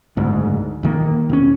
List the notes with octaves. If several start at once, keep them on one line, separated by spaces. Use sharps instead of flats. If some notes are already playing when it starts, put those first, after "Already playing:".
F#1 D2 G#2
D#1 D#3 A#3
E1 C#4